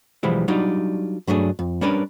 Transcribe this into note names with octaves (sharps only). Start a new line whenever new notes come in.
B1 E3 F3 G3 G#3 E4
F#3 G3 D4 D#4 F4
G2 F#3 A3 D4 G#4
F2
G3 C#4 D4 A#4 B4